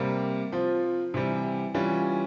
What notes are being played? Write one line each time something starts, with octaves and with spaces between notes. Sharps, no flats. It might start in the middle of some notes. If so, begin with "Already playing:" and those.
Already playing: C3 G3 A#3
F3 C4 F4
C3 E3 G3
E3 G3 C#4 F4